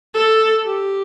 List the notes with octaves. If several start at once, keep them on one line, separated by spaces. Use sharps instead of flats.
A4
G4